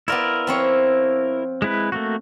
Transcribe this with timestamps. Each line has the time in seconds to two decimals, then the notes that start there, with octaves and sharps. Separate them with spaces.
0.08 B3 E4 F4 A#4 D5
0.47 F3 C4 C#5
1.62 G#3 E4 B4
1.92 A3 A#3 F#4